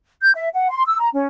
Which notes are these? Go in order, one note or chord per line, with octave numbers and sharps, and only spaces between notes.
G6
E5
F#5
C6
E6
A#5
C#4